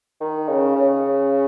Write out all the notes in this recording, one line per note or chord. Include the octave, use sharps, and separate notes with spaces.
D#3
C#3
C#3